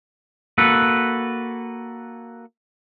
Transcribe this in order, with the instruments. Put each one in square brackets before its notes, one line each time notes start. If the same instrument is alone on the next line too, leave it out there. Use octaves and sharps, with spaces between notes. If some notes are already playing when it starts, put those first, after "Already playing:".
[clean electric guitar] A#3 F#4 A4 B4